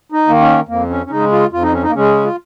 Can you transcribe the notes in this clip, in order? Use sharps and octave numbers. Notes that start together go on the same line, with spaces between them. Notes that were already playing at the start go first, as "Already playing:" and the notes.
D#4
D#3 A#3
C#4
F2 A#3
C#4
C#4
C#3 G#3 D#4
F4
F2 F4
D#4
C#4
D#4
A#3
C#3 G#3 C#4
F4